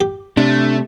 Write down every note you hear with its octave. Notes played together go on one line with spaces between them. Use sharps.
G4
C3 A3 D4